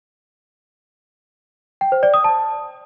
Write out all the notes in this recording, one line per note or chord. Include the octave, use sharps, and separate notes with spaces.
G5
C5
D5
D#6
A5